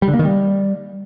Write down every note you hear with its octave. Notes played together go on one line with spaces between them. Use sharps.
G3
D3
A#3
D#3
G3